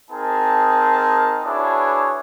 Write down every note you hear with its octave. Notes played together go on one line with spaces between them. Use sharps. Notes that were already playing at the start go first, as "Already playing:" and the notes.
C4 D#4 G#4 A#4 A5
D4 E4 F#4 G#4 B4 C#5